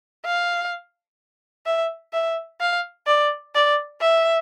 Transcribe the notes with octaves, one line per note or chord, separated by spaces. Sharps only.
F5
E5
E5
F5
D5
D5
E5